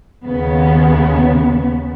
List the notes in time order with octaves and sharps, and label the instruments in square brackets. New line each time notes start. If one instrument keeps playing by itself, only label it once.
[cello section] D#2 C#3 B3